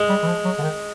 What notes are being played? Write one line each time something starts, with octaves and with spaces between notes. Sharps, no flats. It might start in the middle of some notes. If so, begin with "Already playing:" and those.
Already playing: G#3
G3
E3
F3
F#3
D3
D#3